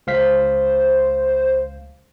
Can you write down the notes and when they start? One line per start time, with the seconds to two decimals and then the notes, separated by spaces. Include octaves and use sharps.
0.07 C#2 C5 F5 B6